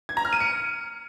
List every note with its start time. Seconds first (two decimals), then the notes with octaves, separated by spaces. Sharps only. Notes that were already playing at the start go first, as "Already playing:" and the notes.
0.09 G#6
0.17 A#5
0.25 F6
0.33 D#7
0.40 C#7